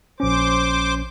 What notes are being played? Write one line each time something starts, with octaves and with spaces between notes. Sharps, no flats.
A#1 C#4 C5 D6